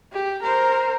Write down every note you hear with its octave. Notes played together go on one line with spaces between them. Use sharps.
G4
A#4 C5